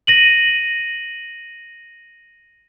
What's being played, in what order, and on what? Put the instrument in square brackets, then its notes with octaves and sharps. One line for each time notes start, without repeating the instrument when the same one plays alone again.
[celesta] A#6 D#7 F#7